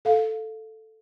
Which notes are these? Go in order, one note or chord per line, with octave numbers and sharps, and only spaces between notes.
A4 F5